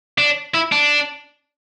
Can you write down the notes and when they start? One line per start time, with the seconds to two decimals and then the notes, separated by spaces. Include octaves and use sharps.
0.18 D4
0.54 E4
0.72 D4